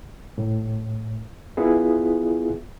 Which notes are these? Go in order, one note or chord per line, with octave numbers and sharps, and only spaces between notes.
A2
B3 E4 F4 G#4